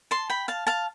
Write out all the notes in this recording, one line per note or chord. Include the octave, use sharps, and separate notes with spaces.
A5 C6
G5 B5
F5 A5
F5 A5